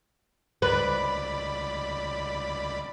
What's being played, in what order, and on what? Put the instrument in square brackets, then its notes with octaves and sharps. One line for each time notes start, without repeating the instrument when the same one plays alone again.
[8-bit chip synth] C#2 D5 B5 [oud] B4